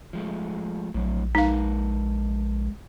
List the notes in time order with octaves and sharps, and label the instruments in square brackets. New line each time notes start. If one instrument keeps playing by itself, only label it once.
[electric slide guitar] F3 G#3 A3
[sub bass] A#1 [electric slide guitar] A2 F#3
[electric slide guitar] G#3 A#4 B4 [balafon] D#4 F5